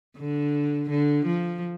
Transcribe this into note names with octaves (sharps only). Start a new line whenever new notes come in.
D3
D3
F3